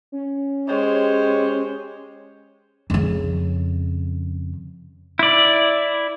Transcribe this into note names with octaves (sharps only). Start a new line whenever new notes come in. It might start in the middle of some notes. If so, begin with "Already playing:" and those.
C#4
G#3 G4 C5 C#5
F2 C#3
E4 D5